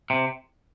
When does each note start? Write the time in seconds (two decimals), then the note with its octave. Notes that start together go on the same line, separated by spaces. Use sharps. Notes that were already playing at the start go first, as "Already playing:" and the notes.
0.10 C3